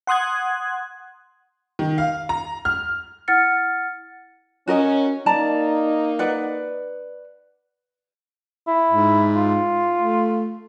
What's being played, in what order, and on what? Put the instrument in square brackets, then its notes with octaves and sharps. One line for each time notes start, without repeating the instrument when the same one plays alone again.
[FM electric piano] F#5 C6 D#6 F#6 G#6
[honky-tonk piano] D#3
F5
A#5
F6
[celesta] E4 F#5 F6 A6 C#7
[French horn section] C#4 [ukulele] F#4 A#4 D#5
[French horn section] A#3 D#4 [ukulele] D5 A5 A#5
[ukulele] B4 D5 F#5
[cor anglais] E4
[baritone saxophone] G#2
[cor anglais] F4
[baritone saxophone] A3